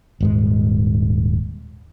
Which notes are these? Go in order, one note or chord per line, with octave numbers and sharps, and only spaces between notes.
D#1 G#2 G#3